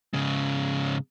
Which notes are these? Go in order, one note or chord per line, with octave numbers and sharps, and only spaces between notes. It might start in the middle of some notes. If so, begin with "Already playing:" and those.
G#2 C#3